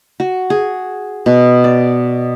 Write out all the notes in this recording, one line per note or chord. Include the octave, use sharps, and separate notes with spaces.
F#4
G#4
B2
D5